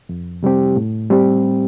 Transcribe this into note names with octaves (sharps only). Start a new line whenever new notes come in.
F2
C3 G3 C4 G4
A2
G3 C4 G4